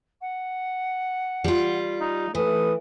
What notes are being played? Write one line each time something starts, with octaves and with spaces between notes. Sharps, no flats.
F#5
G3 F4
D#4
E3 A3 A4 B4 D#6